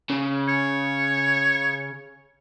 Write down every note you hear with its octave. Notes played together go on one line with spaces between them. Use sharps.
C#3
C#5